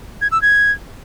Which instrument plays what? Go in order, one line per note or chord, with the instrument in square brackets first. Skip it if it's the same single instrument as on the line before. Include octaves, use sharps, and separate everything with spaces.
[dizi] G#6
E6
G#6